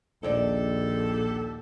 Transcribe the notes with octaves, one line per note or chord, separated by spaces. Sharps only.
A#1 D#2 A#2 A#3 G4 A4 D5